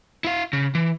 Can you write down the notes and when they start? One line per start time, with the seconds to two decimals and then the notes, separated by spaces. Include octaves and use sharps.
0.24 E4 F5
0.53 C#3
0.75 E3